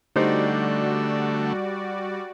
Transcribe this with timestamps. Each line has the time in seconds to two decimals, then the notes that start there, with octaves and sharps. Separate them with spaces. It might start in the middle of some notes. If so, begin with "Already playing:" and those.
0.16 D3 G3 A3 D#4 F#4 G4 C5 D5